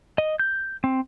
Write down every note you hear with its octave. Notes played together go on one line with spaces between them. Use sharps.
D#5
G6
C4